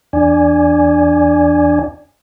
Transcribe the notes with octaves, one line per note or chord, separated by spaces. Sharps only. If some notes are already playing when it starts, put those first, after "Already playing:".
E2 D4 D5 G#5